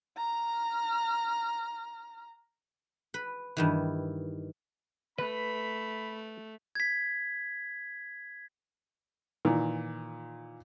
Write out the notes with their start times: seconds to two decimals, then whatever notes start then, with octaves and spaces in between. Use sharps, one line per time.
0.17 A#5 F6
3.14 B4
3.57 G2 D#3 E3
5.18 A3 B4 B5
6.75 G#6 B6
9.45 A#2 D#3 E3